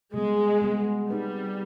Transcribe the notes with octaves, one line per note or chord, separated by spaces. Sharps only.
C3 G3 G#3 B3
C3 G3 B3
G3 C4 D#4 G#4 B4